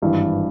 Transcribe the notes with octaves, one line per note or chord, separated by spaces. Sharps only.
G#1 G2 E3